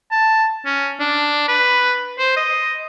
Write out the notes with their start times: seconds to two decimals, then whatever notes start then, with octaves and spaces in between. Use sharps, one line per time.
0.11 A5
0.65 C#4
1.00 D4
1.48 B4
2.19 C5
2.37 D#5